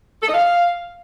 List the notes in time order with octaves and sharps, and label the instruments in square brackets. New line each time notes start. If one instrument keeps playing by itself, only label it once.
[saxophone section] A4
D#5
F5